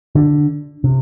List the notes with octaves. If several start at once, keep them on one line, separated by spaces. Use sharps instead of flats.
D3
C3